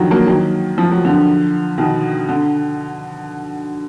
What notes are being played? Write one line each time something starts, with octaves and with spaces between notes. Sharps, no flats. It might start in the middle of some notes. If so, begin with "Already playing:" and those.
Already playing: D3 D#3 F3 F#3
F#3 A#3
D#3 F#3
F3
F#3
D3 F3
B2 D#3
D3